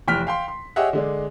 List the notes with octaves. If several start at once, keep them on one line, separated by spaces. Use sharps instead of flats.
F1 E3 G5 F6 B6
F5 G5 C6
C6
G4 G#4 C#5 D#5 E5 F#5
D3 G#3 D4